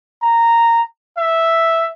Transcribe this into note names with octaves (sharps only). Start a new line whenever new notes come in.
A#5
E5